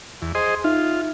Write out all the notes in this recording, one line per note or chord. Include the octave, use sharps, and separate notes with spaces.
E2
G#4 C5 D#5
D#4 F4 E5